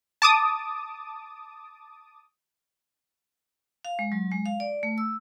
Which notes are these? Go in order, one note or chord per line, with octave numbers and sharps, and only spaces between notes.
A5 D6 D#6
F5
G#3
F#3
G#3
F5
D5
A3
E6